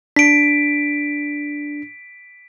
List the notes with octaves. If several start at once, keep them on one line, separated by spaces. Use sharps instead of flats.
D4 B6 D7